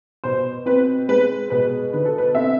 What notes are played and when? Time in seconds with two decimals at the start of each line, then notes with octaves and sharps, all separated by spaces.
0.24 B2 C5
0.66 C4 B4
1.09 G#3 B4
1.50 B2 B4
1.93 D3 B4
2.05 A4
2.18 B4
2.35 C4 E5